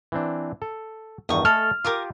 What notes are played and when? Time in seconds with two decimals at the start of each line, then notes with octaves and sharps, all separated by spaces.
0.12 E3 C4 D4
0.62 A4
1.29 E2 G2 D#3 C#6 D#6
1.45 A3 A4 D#5 G#5 F6
1.84 F4 G4 A#4 D6 D#6